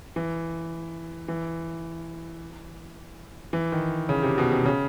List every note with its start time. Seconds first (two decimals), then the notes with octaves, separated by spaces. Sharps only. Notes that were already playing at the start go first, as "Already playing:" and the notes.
0.16 E3
1.28 E3
3.53 E3
3.72 D#3
4.09 C#3
4.23 C3
4.38 B2
4.51 C3
4.65 C#3